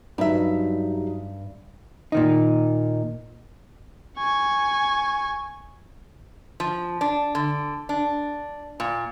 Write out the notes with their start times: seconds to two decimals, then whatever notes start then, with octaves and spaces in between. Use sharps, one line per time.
0.18 G2 F#3 G3 D#4 E5
2.12 A#2 D#3 D#4
4.18 G#5 C#6
6.60 F3
7.01 D4
7.35 D3
7.89 D4
8.80 A#2